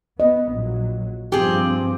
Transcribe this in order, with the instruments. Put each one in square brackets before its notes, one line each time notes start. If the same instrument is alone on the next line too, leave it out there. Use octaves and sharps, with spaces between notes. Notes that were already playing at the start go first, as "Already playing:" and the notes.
[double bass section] B3 [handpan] D#5
[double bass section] A#1 F#3
[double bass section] G2 F3 C4 [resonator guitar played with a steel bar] G4 G#4